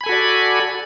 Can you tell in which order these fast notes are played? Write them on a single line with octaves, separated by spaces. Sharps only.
B5 G#5 A4 F#4 D5